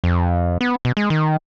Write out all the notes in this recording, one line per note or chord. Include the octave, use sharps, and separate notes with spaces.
F2
B3
B2
G#3
D#3